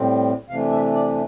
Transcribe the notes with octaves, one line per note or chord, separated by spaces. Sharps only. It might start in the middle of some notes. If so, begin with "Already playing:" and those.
Already playing: A2 G3 C4
C3 E3 A3 D4 F5
E5
D5